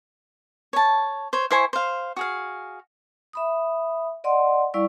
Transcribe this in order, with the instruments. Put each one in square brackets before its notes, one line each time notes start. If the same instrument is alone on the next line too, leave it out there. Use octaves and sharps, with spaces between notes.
[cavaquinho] C#5 A5
C5 C#5
E4 C5 G#5 C#6
C5 F5
F#4 G#4 F5
[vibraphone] E5 B5 D#6
D5 D#5 F#5 C6
G3 E4 D5 F5 C#6 E6